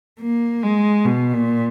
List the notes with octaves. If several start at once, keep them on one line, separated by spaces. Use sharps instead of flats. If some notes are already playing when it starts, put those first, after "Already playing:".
A#3
G#3
B2
A#2